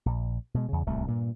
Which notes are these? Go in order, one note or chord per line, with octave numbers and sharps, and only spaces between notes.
A#1
B2 G#3
E2 C#3
D1 C2 A3
G2 A#2